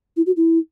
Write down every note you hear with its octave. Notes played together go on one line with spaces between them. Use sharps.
E4
F#4
E4